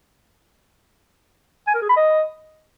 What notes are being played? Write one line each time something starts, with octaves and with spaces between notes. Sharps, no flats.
G#5
A#4
G#4
B5
D#5